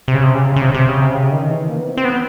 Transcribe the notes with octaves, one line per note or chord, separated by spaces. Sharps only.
C3
C#3
C3
C#3
C#3
C3
C3
C#3
C3
C#3
D#3
E3
A#3
B3
C4
C4
B3